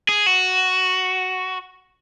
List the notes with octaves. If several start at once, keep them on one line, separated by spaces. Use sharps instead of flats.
G#4
F#4